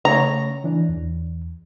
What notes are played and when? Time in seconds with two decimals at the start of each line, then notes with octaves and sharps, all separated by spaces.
0.05 C#3 A3 C#5 A#5
0.64 E3 D4
0.89 E2